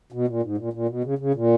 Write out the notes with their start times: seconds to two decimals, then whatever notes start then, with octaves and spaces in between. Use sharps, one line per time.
0.12 B2
0.28 A#2
0.43 G#2
0.58 A#2
0.73 A#2
0.89 B2
1.04 C#3
1.19 C#3
1.34 A#2